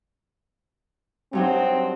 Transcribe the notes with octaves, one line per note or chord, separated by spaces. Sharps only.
G2 F#3 C4 D#4